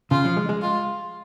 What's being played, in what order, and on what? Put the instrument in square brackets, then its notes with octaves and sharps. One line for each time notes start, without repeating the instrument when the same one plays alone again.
[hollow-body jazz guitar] C#3 [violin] F4
[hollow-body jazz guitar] F3
G#3
G#3
[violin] F4